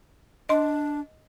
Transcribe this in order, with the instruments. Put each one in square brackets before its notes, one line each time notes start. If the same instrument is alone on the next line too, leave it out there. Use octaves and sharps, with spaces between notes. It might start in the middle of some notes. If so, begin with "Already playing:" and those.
[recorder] D4 [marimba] D#5 C6